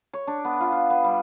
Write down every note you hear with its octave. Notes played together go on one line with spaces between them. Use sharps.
C#5
D4
B3
F4
F4
B3
G3